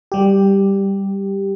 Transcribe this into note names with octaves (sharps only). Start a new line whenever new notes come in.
G3 G4